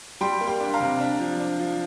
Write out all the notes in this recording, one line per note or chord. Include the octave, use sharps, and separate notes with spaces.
G3 G5 C6
A#3
G5 C6
D4
F5 A#5
C3
D4
F3
D4
F3